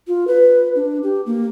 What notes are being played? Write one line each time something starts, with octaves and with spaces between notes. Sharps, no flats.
F4
B4
D4
G4
A#3